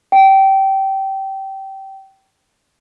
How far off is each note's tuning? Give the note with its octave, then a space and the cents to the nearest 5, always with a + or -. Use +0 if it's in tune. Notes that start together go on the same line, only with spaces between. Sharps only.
G5 -20